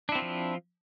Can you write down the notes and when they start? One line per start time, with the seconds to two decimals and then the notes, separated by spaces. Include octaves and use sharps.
0.09 D4
0.12 E4
0.15 C4
0.19 F4
0.22 F3